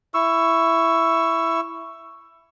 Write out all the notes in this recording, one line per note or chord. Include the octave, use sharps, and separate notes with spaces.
E4 C#6 E6